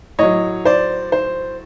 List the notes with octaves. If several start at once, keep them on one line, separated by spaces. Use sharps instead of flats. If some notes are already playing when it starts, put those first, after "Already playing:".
A2 F#3 C#5 D#5
C5 D5
C5